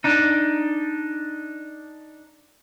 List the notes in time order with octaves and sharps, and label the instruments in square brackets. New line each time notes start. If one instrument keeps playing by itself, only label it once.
[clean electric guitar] D4 D#4